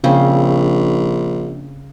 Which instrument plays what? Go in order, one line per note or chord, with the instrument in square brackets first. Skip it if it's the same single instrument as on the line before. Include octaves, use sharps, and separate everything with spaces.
[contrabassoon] A#1 [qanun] C#3 C4